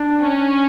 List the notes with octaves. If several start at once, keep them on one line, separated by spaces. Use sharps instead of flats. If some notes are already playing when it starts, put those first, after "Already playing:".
Already playing: D4
C#4